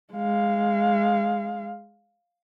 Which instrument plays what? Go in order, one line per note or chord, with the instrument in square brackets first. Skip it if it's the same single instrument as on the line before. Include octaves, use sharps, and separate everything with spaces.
[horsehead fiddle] G#3 F5